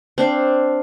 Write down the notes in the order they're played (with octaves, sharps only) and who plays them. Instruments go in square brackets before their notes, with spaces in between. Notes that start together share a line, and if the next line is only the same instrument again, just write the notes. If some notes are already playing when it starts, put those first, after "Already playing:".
[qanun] C4 D4 F5